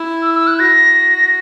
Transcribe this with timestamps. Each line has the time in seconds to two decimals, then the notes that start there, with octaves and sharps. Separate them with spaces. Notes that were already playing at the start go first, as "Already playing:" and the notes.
Already playing: E4
0.22 E6
0.34 E6
0.47 F#6
0.59 F#4 A#6